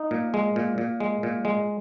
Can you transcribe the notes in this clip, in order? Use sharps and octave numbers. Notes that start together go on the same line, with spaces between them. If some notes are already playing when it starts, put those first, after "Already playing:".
Already playing: D#4
A#2
G#3
A#2
A#2
G#3
A#2
G#3